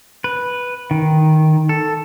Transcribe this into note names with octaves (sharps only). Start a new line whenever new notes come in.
B4
D#3
A4